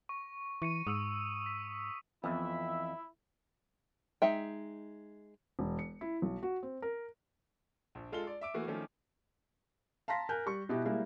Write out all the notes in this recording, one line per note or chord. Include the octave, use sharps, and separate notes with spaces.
C#6
E3 C#6 C#7 D#7
G#2 D#6 E6 C#7
B6
F2 E3 F3 B3 E4 E5
G#3 D#4 E5 G5
E1
C#7
E4
B1
F#4
C4
A#4
A#1
G#3 F4 A4 A5 G7
D5
E5 D6 D7
E3 A3 A#3 F#4
D#3 F3 A3 C#4
F5 A5 A#5 C6 A#6 B6
A#4 G#5 F#6 G6
G3 C#6
B2 E4 G4
G3 G#3 A#3 E4